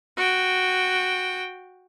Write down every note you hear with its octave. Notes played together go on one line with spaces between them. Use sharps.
F#4 G5